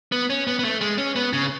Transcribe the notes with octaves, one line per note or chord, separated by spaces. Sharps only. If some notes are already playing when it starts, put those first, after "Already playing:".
B3
C#4
B3
B3
A3
G#3
C#4
B3
C#3